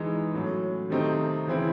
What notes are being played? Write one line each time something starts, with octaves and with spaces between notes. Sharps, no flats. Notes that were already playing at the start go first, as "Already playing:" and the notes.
Already playing: E3 G#3 D#4
A2 F#3 C#4
C3 D#3 A3 C4 D#4
C#3 E3 C4 E4